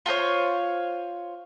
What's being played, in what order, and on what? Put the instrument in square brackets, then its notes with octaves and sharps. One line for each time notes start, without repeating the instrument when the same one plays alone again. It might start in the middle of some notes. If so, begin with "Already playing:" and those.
[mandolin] F4 A4 C5 C#5